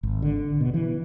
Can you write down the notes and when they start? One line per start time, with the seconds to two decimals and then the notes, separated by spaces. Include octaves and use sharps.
0.03 G#1
0.22 D3
0.61 B2
0.74 E3